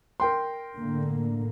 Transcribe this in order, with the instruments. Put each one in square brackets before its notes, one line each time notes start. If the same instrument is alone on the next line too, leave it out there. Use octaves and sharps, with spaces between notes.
[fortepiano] A#4 G5 C6
[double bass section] A2 D3 A#3